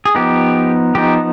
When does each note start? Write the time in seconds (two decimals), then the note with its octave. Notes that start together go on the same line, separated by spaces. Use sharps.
0.05 G#4
0.15 F3 B3 D#4 G4
0.95 F3 B3 D#4 G4